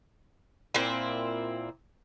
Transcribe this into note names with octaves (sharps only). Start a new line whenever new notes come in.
A#2 C4 E4